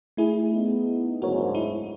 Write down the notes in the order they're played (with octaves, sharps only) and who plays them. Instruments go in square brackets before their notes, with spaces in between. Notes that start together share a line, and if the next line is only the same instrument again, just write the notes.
[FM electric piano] A3 E4 G#4
[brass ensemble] B3 D#4
[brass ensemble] F#1 D2 G#2 [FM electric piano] F#4 A#4 C#5
[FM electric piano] E4